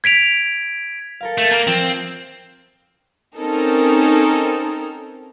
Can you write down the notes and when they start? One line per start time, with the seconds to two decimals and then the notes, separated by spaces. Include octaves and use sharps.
0.04 G#6 B6 D7 F7
1.21 A4 A#4 F5
1.38 A3 G6 G#6 D#7
1.52 A#3 F6 G#6
1.67 F3 C4
3.37 C4 C#4 D#4 A4 A#4